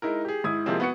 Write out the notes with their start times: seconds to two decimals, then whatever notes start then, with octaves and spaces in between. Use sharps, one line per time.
0.02 G#3 D#4 E4 A#4
0.25 G4 G#4
0.44 G#2 E4 D#6 G#6
0.66 C3 F3 G#3 A#3 C4
0.80 B3 F#4 C#7